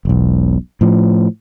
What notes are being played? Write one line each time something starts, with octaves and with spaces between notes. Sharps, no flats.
E1 B1
A2 F3